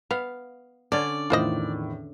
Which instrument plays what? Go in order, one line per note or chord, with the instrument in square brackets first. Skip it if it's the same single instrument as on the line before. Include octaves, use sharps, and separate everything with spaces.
[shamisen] B3 [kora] F5
[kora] D3 C#4 [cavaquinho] D5
[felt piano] E2 A2 D#3 [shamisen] F4 C5 D#5